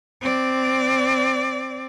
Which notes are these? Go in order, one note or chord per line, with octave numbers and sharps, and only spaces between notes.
C4 D5